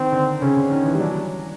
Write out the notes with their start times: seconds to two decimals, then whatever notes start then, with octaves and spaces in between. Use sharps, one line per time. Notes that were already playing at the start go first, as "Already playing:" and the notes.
Already playing: D#3 C4
0.12 D3
0.42 C#3 C#4
0.57 D3
0.71 D#3
0.85 E3
0.94 G3
1.00 F#3 D4